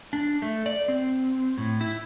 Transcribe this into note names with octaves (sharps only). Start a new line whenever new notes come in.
D4
A3
D5
C4
A2
E4